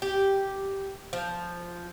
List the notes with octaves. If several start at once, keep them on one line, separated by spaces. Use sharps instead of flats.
G4
F3